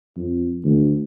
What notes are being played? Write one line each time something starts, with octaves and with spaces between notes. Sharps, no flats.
F2
D2